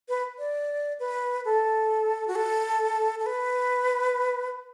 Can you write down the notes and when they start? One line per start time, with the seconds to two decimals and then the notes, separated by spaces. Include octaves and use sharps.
0.09 B4
0.38 D5
1.00 B4
1.45 A4
2.28 F#4
2.35 A4
3.19 A4
3.26 B4